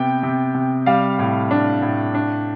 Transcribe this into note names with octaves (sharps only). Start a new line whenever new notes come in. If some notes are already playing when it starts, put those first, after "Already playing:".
Already playing: C3 B3 G5
C3
C3
G3 F5
A2
D4
A2
D4